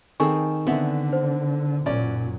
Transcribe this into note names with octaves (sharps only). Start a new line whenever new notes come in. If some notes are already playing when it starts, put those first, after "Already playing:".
D#3 C4 G#4 A4 G#5 C#6
D3 B3 C4 E5 F#5
C5
F#1 F#2 A#2 C#4 D5